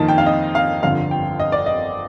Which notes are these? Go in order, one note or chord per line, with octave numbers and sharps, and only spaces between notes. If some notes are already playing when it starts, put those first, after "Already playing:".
Already playing: F2 D#3 A#3 D#4 A5
G5
F5
D#5
F5
G1 F2 D3 F5
G5
D#5
D5
D#5